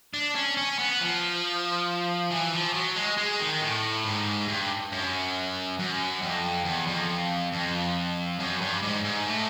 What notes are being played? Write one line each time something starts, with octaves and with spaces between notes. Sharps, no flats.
D4
C#4
C#4
B3
F3
E3
F3
F#3
G#3
G#3
D#3
A2
G#2
G2
F#2
F#2
F2
E2
F2
F2
F#2
G2
G#2
G#2
A2